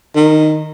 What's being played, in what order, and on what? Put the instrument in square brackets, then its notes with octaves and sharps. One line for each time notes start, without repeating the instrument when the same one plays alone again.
[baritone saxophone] D#3